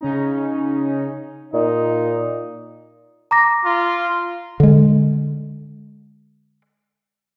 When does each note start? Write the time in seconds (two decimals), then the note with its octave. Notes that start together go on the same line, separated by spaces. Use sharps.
0.01 C#3 C#4 D#4
1.54 A#2 D#4
3.31 A#5 D6 A#6
3.64 F4
4.60 D3 G#3